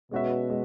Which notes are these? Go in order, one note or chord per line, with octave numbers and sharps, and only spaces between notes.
B2 G#3 C#4 F#4 B4 E5
G#3